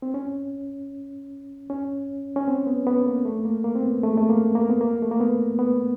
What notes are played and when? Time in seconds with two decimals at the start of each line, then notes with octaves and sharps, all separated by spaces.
0.02 C4
0.14 C#4
1.70 C#4
2.36 C#4
2.47 C4
2.67 B3
2.87 B3
3.06 A#3
3.25 A3
3.45 A#3
3.64 A#3
3.75 C4
3.84 B3
4.03 A3
4.10 G#3
4.17 A3
4.29 A#3
4.55 A#3
4.70 B3
4.81 A#3
5.02 A3
5.11 A#3
5.20 B3
5.59 B3